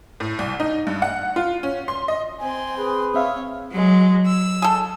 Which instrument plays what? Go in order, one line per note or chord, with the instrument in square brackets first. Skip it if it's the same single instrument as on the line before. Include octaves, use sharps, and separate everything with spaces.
[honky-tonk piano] A2
C2
D#4
G2
F#5
F4
C#4
C6
D#5
[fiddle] C4 C6 [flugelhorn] G#5
[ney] G#4 [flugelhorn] B4
[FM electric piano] C4 E5 F5 [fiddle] C#5
[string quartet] F#3 G#3
E6
[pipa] G#4 A4